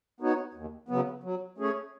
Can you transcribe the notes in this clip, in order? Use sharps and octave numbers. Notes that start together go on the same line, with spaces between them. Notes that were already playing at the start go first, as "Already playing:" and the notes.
B3 D#4 F#4 C#5
D#2
C#3 F#3 B3
F#3
A3 C#4 G#4 C#5